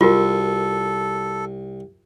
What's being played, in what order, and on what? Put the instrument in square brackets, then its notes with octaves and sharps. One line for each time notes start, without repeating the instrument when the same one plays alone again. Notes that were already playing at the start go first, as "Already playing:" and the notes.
[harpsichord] C2 [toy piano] F4 F#4 A#4 [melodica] A4